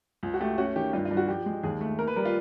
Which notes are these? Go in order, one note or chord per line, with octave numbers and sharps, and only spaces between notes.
C#2
F#4
A3 G4
C#4 F#4
D#3 G4
G2 F4
F4
G2
F#4
F3 G4
G#3
D#2 G#4
A3
A#3 A#4
B4
G3 A#4
F4